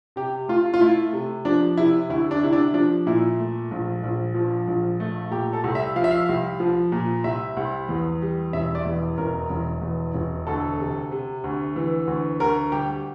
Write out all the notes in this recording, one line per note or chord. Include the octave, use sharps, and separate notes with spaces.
C3 G4
A3 F4
F4
A3 E4
C3
F3 D4
C3 E4
D2 E4
D4
C3 E4
D4
F3 D4
A#2 E4
A3
A#1
A#1
F3
A#1
A3
A#2 G4
A4
C2
E5
F3 F5
E5
F5
C2
F3
A#2
C2 E5
C2
E2
G3
E1 E5
D5
E2
E1 A#4
E1
E2
E1
D2 A4
C3
C3
D2
E3
D2
D2 A#4
G3 G4